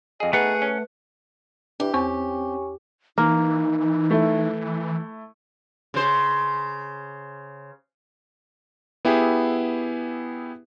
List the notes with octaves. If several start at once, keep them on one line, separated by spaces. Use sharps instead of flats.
F2 G#4 D#5
A3 B3 D#4 G#4 B4 F#5
C#4
E3 D4 G4
E2 C4 C#4 C#6
E3 A#3 D#4
A3 E4
C#3 C5
B3 E4 G4 G#4